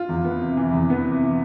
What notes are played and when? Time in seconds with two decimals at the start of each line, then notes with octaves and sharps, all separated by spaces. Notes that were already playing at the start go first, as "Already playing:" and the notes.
Already playing: F4
0.09 E2
0.24 B3
0.41 C3
0.57 E3
0.73 E2
0.90 B3
1.05 C3
1.22 E3